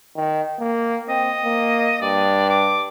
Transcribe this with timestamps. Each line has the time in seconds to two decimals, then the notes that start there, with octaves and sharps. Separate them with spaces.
0.16 D#3
0.59 A#3
1.09 C4 D#5
1.44 A#3
2.01 G2 D5
2.50 D6